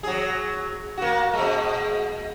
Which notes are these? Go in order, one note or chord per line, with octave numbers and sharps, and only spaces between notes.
F#3 G#4
A#3 F#4
A#2 G#3